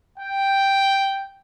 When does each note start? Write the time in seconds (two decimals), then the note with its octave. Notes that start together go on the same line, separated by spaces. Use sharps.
0.19 G5